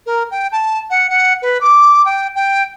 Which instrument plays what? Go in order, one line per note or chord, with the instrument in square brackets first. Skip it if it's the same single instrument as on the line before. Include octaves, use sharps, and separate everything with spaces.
[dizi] A#4
G5
A5
F#5
F#5
B4
D6
G5
G5